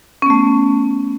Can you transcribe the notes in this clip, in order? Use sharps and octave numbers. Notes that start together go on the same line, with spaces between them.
A3 B3 C#4